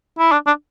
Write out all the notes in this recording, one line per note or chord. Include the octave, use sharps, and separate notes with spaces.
E4
D4
D4